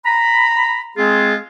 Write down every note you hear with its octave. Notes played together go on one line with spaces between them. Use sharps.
A#5 B5
G#3 C4 F4 G#4